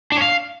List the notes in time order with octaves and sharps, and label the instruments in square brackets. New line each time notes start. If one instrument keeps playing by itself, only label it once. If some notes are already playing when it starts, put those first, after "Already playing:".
[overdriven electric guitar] D4
C#5
F5